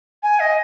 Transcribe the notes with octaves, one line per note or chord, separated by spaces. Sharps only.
G#5
D#5